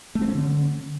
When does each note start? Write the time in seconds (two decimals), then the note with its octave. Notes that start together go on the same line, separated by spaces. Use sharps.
0.15 A3
0.22 C4
0.28 C#4
0.35 D3